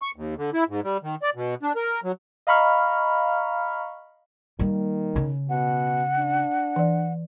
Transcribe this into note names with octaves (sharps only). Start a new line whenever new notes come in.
C#6
D#2
D3
E4
G#2
G3
D#3
D5
B2
D4
A#4
F#3
D#5 F5 A#5 B5 C#6 F6
D#3 G3 A#3
C#3 C#4
B2 F#5
D4
E3 D5